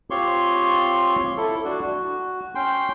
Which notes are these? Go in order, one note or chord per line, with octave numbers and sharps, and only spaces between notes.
C4 F4 G4 C#5 C6 C#6
E4 A4
D4 F#4
F#4
C#4 G5 C6